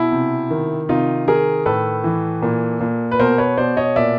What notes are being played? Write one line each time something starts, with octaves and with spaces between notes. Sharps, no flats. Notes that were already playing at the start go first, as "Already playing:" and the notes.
Already playing: B2 E4
C3
D#3
C3 D#4 F4
D#3 G#4 A#4
A2 A4 B4
E3
A#2
A#2
B4
B2 A#4 C5
B4 C#5
B2 C5 D5
C#5 D#5
A#2 D5 E5